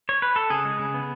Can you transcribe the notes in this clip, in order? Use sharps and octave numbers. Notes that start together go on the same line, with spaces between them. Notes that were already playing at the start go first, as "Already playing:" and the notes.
C#5
B4
A4
C#3 G#4
G#3
C#3
B3